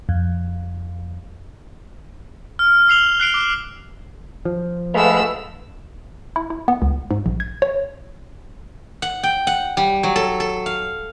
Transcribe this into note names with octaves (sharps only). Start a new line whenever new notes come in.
F2
F6
E6 C7 F7 G7
F#6 C7 D7 F7
D6
F3
G#3 A3 B4 F5 F#5 E6
E4
E4
B3
C#2
G#2
A#1
G#6
C#5
F#5
G5
F#5
G3
F#3
A4
A4
F5